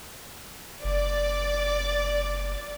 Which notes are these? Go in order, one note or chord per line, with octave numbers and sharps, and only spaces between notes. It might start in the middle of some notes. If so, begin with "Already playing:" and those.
F#1 D5